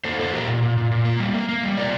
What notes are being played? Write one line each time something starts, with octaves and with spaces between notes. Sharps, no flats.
A#3 A4 C5
A#3 A4 C5
A#2 G4 A#4
A#2
A#2
A#2
A#2
A#3
G3
A#3
A#3
G3
C3 A#4 D5